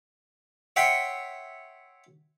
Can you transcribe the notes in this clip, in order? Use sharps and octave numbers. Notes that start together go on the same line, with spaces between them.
C#5 E5 F#5 G5 C6 C#6